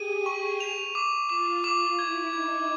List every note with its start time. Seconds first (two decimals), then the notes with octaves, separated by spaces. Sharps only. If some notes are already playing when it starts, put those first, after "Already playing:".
Already playing: G4 G#4 D#7
0.26 C#6
0.60 F7
0.95 D6
1.29 F4 D6
1.64 D6
1.99 E4 G#6
2.33 D#4 G#6